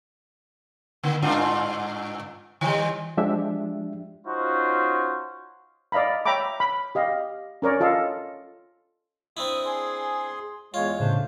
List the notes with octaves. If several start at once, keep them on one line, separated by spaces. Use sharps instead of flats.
D3 A#3
G2 D4 F4
D#3 G3
F3 G#3 D4 G4 E5
C#4 D#4 F4 F#4 C5
D5 D#5 F5 A#5 B5
C#5 E5 G5 A#5 B5 D6
B5
G4 D#5 F5
C#4 A#4 C#5 D5
F4 A4 D#5 F5
C4 D4 E4 D#6
G#4 C6
E2 G#3 F4 C#5
A2 C#3 A3 D4 C5